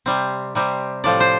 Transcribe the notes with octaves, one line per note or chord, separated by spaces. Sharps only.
C3 G3 C4
C3 G3 C4
A2 F3 C4 D5
C5